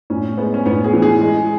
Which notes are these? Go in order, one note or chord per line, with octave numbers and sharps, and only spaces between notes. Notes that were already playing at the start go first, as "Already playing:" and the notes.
A2 C#4
G#3 B3
C#4
A2 B3
G#4
E3
G#4
G#3